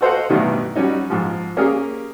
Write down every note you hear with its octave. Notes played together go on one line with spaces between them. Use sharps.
F#4 A4 C5 D#5 F5 F#5
A1 G2 B2 D#3 F#3
F#3 G3 C#4 D#4
G#2 F3
A#3 C#4 G4 G#4 A#4